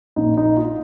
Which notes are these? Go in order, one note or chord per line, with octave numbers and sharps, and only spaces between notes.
A#1 A#2 D#4
D#4
F4